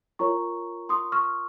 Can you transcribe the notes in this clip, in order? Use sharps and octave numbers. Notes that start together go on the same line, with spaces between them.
F4 A#4 C#5 A#5 C#6
C6 D#6
C#6 F6